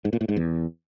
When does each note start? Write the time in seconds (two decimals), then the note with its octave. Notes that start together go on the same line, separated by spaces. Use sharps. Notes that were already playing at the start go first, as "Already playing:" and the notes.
0.05 G#2
0.13 A#2
0.21 A2
0.29 G#2
0.37 E2